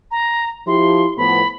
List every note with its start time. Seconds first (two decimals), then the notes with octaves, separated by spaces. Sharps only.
0.11 A#5
0.67 F3 E4 G4 C6
1.17 A2 F3 B3 B5